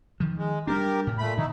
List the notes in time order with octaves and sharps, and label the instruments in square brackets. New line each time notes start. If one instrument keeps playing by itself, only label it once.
[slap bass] D#3 F3
[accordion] G#3
[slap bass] G3 B3 D4 [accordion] G4 A#4
[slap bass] A2
[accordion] A#2 A3 B5
[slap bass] A#2 D#3 [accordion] D#4 E4